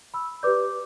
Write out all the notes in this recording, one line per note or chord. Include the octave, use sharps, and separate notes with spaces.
B5 E6
G4 B4 D5 D6 G6